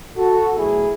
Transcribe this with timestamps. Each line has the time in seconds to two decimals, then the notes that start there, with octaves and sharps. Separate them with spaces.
0.17 F#4 A4
0.57 E2 B2 F#3 A3 E4 G#4